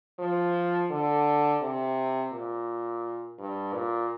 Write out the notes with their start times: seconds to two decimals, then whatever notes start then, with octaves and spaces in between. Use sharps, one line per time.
0.19 F3
0.91 D3
1.62 C3
2.33 A#2
3.39 G2
3.74 A#2